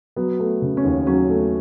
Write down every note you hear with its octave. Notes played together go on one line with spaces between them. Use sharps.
F#3 B3
A3
C#3
C#4
D#2
F#3 C#4
A3